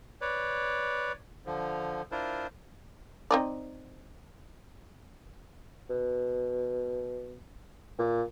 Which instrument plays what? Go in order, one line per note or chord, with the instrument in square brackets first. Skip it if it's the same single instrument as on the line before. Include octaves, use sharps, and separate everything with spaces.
[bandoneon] B4 C#5 D5
D3 F3
D4 E4 F4 A#4 C5
[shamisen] C4 D#4 D5
[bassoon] B2
A#2